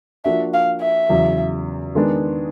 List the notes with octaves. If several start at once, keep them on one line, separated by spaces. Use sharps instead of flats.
F3 A#3 D4 F#4 E5
F5
E5
E2 C#3 F#3
D#3 G#3 B3 D4